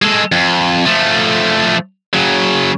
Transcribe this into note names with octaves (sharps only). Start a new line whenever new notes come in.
G#3 A4
F2
F3 A3
C#3 F#3